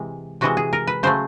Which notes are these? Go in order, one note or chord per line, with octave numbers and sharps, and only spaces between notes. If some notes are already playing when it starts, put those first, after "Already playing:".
Already playing: C3 E3 G#3
C3 E3 G#3 F#4
G#4
A#4
B4
C#3 F#3 A3 C5